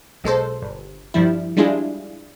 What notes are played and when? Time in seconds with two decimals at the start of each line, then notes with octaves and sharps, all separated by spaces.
0.24 B1 G#3 A4 C5
0.62 G1
1.14 G2 F3 G3 E4
1.57 G3 G#3 D4 E4 F4 G#4